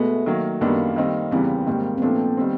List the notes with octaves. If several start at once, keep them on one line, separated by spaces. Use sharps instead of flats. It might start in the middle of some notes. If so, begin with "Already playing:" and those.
Already playing: B2 G#3 A3 B3
D#3 F#3 A#3
F#2 D#3 G3 A#3 B3 D4
D#3 G3 C4 D#4
E2 C#3 E3 G3 B3 C4
G#2 D#3 G3 A#3
C4
A#2 F3 A3 B3 D4
D#3 G3 C4